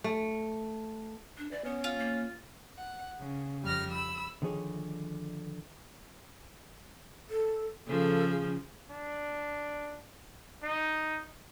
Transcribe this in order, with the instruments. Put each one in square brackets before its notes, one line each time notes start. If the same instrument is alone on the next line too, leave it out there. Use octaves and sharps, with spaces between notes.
[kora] A3
[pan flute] D4
[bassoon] E3 [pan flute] D5
[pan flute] B3 [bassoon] C#4
[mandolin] F4
[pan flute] A#3
[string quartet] F#5
C#3
F2 G3 F6 A#6
B5 E6
[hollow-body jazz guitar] D3 D#3 F3 G#4 C#5
[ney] A4
[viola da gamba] C#3 F3 [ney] A4
[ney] G#4
[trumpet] D4
D#4